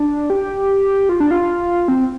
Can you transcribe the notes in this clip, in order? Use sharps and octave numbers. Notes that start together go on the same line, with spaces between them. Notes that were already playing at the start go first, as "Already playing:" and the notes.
Already playing: D4
G4
F4
D4
F4
C4